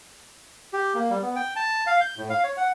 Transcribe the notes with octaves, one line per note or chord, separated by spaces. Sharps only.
G4
A#3
G3
B3
G5
A5
F5
G6
A2
F5
C#5
F#5